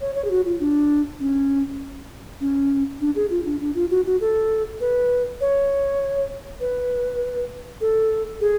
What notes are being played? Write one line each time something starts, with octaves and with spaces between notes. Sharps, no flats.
C#5
C#5
G#4
F#4
F4
D4
C#4
C#4
D4
G#4
F4
D4
D4
F4
F#4
F#4
A4
B4
C#5
B4
A4
G#4